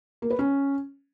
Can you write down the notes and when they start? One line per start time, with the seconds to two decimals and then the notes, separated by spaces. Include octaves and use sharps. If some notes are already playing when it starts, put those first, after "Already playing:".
0.22 A#3
0.30 B4
0.39 C#4